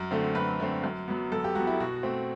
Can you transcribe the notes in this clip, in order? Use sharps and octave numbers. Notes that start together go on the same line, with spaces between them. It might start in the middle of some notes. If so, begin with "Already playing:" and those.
Already playing: F#2
D3 A3 C4
F#2 B4
D3 A3 C4
F#2
F#3 B3
F#2 A4
G4
F#3 B3 F#4
E4
B2 F#4
A3 C4